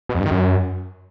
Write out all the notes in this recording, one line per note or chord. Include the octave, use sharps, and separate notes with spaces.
B2
F2
G2
D#3
F#2